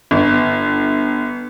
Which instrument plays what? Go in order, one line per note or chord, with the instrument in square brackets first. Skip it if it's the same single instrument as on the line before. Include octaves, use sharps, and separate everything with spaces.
[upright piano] G1